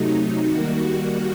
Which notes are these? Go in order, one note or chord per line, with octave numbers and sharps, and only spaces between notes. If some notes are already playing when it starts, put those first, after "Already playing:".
Already playing: C3 F#3 A3 D#4
D#3 G3 A#3 F#4